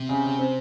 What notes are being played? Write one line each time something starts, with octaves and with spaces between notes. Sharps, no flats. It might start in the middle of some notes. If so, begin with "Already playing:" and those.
Already playing: C3
C#3
C#3
C4